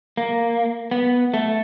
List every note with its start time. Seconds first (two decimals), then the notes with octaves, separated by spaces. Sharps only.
0.17 A#3
0.91 B3
1.34 A3